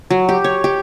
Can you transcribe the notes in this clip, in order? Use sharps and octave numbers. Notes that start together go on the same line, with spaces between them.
F#3
G4
C#5
G4